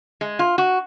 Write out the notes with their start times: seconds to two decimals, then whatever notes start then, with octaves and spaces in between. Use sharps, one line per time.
0.21 G#3
0.39 F4
0.58 F#4